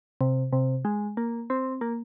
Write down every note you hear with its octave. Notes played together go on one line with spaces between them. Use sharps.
C3
C3
G#3
A#3
C4
A#3